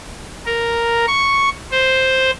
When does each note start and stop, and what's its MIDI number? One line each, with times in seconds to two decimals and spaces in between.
0.46 1.05 70
1.08 1.49 85
1.71 2.31 72